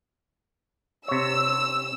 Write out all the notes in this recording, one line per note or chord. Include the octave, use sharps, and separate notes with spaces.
C3 C#5 E6